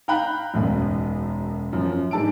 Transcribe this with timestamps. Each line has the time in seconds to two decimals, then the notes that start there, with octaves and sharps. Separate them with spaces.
0.08 F5 G5 A#5 B5 F#6
0.53 E1 B1 F#2
1.73 F#2 F3
2.11 G#2 G#3 D4 A5 E6 D7